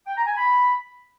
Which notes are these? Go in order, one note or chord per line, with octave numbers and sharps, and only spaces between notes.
G5
A#5
G#5
B5